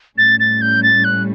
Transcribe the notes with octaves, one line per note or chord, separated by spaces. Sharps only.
A2 G3 C#4 A6
A6
G6
A6
F#6